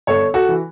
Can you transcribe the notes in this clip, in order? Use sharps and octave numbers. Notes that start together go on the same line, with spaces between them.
G1 A4 C#5
F#4 A4
E3